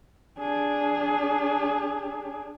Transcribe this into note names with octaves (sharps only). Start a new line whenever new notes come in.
D4 G#4